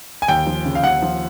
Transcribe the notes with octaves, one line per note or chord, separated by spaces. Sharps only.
G#5
D#2 G5
F3
C#3
F5
D#2 F#5
F3